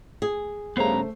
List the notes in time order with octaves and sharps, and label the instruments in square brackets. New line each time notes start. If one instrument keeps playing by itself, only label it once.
[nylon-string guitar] G#4
[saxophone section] G2 C#3 [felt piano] A3 C5 C7 [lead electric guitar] B3 A#5